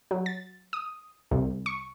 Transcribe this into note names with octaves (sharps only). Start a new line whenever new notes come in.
F#3
A6
D#6
C2
C#6